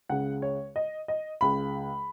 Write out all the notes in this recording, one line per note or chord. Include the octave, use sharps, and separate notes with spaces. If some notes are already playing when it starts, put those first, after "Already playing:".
C#2 C#3 F#5
C#5
D#5
D#5
C#2 C#3 B5